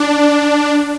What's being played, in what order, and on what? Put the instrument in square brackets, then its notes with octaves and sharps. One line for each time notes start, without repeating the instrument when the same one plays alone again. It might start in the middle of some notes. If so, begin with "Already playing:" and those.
Already playing: [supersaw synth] D4